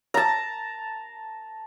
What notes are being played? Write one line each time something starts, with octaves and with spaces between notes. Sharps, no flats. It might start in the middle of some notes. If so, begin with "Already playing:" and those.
A5 A#5